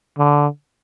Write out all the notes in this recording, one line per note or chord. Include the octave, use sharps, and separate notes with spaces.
D3